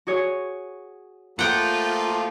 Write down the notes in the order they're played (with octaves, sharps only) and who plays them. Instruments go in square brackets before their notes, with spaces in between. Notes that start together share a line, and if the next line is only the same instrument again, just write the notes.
[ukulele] F#4 G#4 C#5
[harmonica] F3 A3 A#3 [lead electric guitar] F4 [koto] F#5 G5